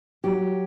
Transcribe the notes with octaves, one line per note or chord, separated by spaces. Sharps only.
F#3 G4